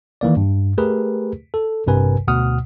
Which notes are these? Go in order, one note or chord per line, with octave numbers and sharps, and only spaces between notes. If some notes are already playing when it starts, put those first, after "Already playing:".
D#3 E3 A#3 D5
G2
A3 G4 G#4 A#4 B4
A4
A1 G2 C3 A#4 B4 G#5
D2 B2 F#5 D#6 F6